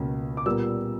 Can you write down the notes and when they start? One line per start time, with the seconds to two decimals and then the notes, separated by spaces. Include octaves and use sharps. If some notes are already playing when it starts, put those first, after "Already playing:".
Already playing: C#2 B2 A#3 C#4
0.37 D6
0.46 A#2 G3 B3 E6